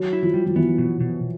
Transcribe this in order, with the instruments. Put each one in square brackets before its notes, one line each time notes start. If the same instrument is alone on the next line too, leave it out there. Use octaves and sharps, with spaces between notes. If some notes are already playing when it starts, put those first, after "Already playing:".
Already playing: [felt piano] F#3
[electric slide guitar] E4
[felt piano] F3
[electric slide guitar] G3
[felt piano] F3
[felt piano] E3 [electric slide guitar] B3
[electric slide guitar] B2
B2